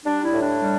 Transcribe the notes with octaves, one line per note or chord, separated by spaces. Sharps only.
G3 D4
E4
A2
D4
G3